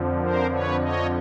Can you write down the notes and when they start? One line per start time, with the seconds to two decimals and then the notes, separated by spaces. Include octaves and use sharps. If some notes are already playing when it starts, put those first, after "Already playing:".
Already playing: F2 D3 F3
0.20 A#4 C5
0.50 B4 C#5
0.80 C#5 D#5